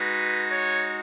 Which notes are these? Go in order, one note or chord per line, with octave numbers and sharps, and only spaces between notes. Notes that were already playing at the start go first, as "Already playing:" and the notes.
Already playing: G#3 D#4 F#4 B4
C#5